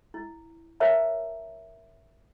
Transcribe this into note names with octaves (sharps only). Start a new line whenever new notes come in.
E4
A#4 C5 C#5 E5 A5 A#5